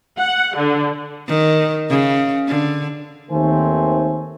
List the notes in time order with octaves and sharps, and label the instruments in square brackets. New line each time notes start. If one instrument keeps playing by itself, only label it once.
[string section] F#5
D3
[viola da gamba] D#3
C#3
D3
[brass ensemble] D#2 D#3 A3 C4 C5 G#5